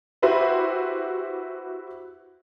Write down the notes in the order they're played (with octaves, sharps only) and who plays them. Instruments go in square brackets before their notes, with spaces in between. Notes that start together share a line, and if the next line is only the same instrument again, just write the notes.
[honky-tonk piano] E4 F#4 G4 B4 C5 E5